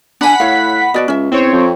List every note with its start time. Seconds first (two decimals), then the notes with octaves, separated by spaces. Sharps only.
0.21 D4 F#5 G#5 B5 B6
0.40 A2 C#5 F5
0.94 B2 F#4 D5 D#5
1.08 C#2 C#4 E5
1.31 E2 C4 C#5
1.52 F2